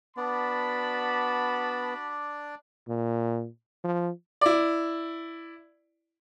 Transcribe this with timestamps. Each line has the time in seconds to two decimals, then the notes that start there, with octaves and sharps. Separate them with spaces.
0.17 B3 D4 F#4 D5 A5 B5
2.88 A#2
3.84 F3
4.41 E4 D5